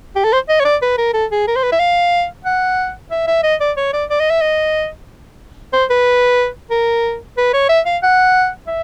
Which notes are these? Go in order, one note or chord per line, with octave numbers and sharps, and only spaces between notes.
G4
A4
C5
D#5
C#5
D5
B4
A#4
A4
G#4
A#4
C5
B4
E5
F5
F#5
E5
E5
D#5
D5
C#5
D5
D5
D#5
E5
D#5
C5
B4
A#4
B4
C#5
E5
F5
F#5
E5